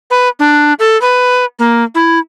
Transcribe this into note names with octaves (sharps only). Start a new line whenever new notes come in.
B4
D4
A4
B4
A#3
E4